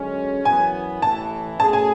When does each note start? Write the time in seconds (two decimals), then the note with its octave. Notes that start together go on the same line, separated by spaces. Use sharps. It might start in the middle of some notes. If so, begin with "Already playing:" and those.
Already playing: F#2 D3 G#3 C#4
0.45 F#2 E3 B3 G#5
1.02 A1 A2 E3 A5
1.59 B2 A3 C#4 G#4 A5
1.73 G#5